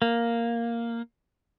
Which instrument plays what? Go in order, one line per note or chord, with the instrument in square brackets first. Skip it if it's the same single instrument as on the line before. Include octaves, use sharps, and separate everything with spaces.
[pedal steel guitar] A#3